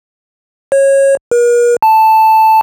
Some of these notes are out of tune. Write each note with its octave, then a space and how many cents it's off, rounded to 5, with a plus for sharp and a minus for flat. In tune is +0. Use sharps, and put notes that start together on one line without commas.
C#5 -20
A#4 +45
A5 +0